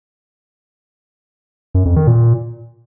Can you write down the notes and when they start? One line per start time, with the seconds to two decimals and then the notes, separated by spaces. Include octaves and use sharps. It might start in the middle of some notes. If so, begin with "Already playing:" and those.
1.75 F#2
1.85 F2
1.96 D#3
2.07 A#2